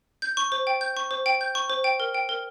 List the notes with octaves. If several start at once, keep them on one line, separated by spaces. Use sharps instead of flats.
G6
C#6
C5
G5
G6
C#6
C5
G5
G6
C#6
C5
G5
A#4
G5
A#4